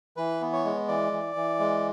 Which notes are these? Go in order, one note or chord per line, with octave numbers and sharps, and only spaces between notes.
E3 B4
B3
C#5
G#3
E3 D5
E3
E3
G#3